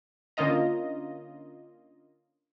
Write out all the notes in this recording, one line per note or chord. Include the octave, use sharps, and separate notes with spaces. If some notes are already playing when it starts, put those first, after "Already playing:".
D3 A#3 C#4 F4 D#5 A#5